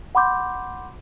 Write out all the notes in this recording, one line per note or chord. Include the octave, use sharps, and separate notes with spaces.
F#5 B5 C6 D6 G6